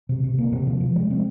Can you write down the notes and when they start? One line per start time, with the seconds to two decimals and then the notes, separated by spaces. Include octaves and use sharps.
0.09 C3
0.24 C3
0.38 A#3
0.52 C3
0.67 F3
0.81 F3
0.96 G#3
1.11 C4